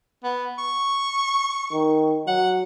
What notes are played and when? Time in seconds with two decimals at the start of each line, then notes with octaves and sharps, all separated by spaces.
0.24 B3
0.58 C#6
1.73 D#3
2.27 F#3 F#5